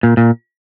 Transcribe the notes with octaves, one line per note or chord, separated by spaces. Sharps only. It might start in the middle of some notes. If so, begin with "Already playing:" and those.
A#2
A#2